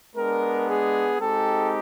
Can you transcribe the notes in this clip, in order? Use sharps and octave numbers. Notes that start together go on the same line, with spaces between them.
G#3 B3 D4 A#4
G#4
G#3 C4 D#4 G4 A4